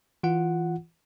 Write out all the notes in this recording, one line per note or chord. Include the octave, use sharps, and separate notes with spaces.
E3 F4 F#5